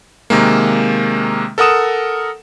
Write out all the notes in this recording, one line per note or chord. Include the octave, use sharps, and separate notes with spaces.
C3 D#3 G#3 A#3
A4 A#4 F#5 D#6 E7